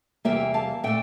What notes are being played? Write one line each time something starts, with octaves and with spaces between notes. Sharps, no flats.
E2 C3 E3 G3 A#3 E5 G5
F5 A5
A#2 A3 E5 G5